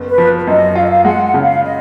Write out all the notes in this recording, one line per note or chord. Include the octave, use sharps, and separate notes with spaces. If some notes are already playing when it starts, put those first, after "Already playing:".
Already playing: F#1 B3
B4
F3
F#2 D#5
F4 F5
D#5
F5
G#3 F#5
F#5
C#3
F5
D#5